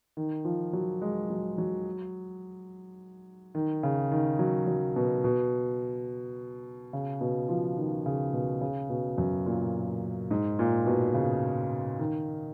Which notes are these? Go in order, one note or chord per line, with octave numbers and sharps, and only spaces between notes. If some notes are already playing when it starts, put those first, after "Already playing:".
D#3
F3
F#3
G#3
F#3
F#3
D#3
C#3
D#3
F#3
F#3
B2
B2
C#3
B2
F3
D#3
C#3
B2
C#3
B2
F#2
A#2
G#2
A#2
B2
C#3
D#3